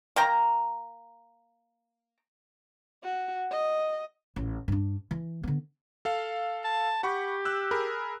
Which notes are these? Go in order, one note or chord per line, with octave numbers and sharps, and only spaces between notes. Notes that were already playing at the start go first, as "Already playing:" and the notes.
A#3 G5 A#5
F#4
D#5
A1
G2 D4
E3
D3 B3
A4 F5
A5
G4 F#5 B5 C#6
E6 F#6
G#4 A#4 B5